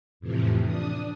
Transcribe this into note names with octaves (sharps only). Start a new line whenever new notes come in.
F2 A2 C3 E3 F3
D4 D#6